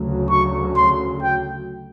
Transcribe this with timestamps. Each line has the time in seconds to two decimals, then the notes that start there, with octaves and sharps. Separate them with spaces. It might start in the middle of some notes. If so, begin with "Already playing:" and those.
Already playing: D2 C#3 F#3
0.30 C#6
0.76 C6
1.22 G5